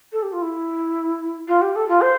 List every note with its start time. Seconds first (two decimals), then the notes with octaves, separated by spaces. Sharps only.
0.12 A4
0.22 G4
0.32 F4
0.42 E4
1.48 F4
1.61 G4
1.75 A4
1.88 F4
2.01 C5